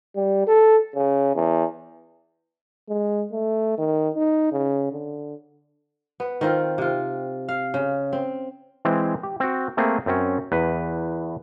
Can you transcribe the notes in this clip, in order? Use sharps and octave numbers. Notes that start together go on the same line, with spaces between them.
G3
A4
C#3
E2
G#3
A3
D#3
D#4
C#3
D3
B3
D#3 C4 F4
C3 F4
F5
C#3
C4
E3 G#3 C4
G4
C4 F#4
A3 A#3 C4 G#4
F#2 C4 C#4
E2 B4